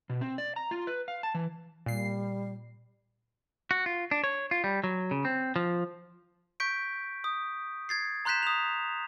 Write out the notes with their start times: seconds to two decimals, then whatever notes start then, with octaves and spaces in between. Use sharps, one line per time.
0.10 B2
0.21 C4
0.38 D5
0.56 A#5
0.71 F4
0.87 B4
1.08 F5
1.23 A5
1.35 E3
1.86 A#2 G3 C7
3.71 F#4
3.86 F4
4.11 D4
4.24 C#5
4.51 F4
4.64 G3
4.84 F#3
5.11 C#3
5.25 C4
5.56 F3
6.60 C#6 G6 B6 D7
7.24 D#6
7.89 G#6 A6 C7
8.25 A#5 C6 F#6 G6 B6 E7
8.43 D#6 F7